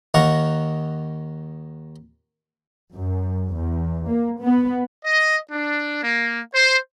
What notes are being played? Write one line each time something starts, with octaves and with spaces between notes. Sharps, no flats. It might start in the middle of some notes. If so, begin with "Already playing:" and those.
D#2 D#3 F5 F#5 A#5 C#6
F#2
E2
A#3
B3
D#5
D4
A#3
C5